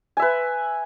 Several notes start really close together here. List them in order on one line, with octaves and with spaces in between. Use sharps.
G#5 E5 B4